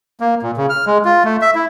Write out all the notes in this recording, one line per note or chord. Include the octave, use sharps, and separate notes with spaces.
A#3
A#2
C#3
F6
G#3
F4
A3
E5
E4